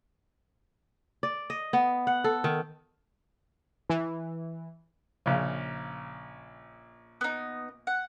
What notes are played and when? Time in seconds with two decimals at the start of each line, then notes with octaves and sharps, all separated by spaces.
1.23 D5
1.50 D#5
1.73 B3
2.07 F#5
2.24 A4
2.44 D#3
3.90 E3
5.26 A#1 C#3
7.21 B3 D#4
7.87 F#5